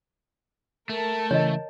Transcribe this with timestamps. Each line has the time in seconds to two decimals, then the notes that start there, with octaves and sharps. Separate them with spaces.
0.89 A3 A#4 A5
1.31 C#3 E3 C#5 D#5